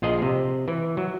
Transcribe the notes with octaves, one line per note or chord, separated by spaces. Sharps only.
A#1 F4 G#4 D#5
C3
E3
F#3